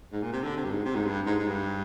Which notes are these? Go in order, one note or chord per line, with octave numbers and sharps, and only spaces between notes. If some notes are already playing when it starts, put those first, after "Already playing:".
G#2
A#2
C3
D3
C3
G2
G#2
C3
G#2
G2
G#2
G#2
G2